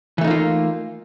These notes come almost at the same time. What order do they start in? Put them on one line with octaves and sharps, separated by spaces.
E3 A3 D#4 A#3 F4